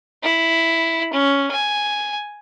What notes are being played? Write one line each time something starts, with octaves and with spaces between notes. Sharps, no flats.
E4
C#4
G#5